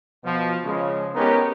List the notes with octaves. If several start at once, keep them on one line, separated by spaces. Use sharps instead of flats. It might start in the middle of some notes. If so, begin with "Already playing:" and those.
B2 F3
C#3 F3 G#3
G#3 B3 C#4 D#4 G4 A#4